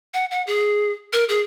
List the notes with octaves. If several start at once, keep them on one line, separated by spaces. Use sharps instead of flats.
F#5
F#5
G#4
A#4
G#4